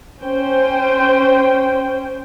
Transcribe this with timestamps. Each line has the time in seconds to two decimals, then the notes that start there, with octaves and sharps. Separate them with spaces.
0.21 C#4 C5 G5